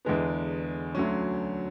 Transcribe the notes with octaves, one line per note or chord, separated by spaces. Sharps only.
E2 D3 G#3 B3
D2 D3 F#3 C#4